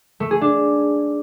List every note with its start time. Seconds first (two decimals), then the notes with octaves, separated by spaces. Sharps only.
0.20 A3
0.31 G#4
0.41 D4